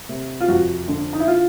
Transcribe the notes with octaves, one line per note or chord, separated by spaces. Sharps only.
C3
F4
F2 F#4
D3
D#4
E4
F4